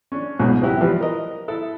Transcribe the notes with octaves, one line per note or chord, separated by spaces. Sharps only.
C#4 D4
C#2 G#2 B2
F#3 B3 C4 E4 G4
E3 F3 G3
A#4 D#5
E4 A4